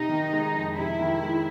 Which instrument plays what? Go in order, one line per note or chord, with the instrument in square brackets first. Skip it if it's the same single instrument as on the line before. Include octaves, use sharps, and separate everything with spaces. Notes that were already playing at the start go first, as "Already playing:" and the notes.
Already playing: [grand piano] C3 [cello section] D#4
[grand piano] D#3
G#3
F2
[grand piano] C3 [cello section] E4
[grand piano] D#3
G#3